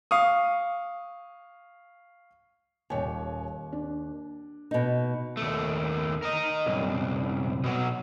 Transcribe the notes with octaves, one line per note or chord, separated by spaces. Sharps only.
F5 C#6 D#6
D#1 D#2 C#5 G#5
D4
B2 D#4
D#2 A3
A#4 D#5
C2 F#2
B2 F#3